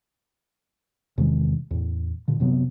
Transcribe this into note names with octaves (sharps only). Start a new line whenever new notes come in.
E2 C3 D#3 G#3
E2 A2
A#2 D3
F#2 C3 F#3 B3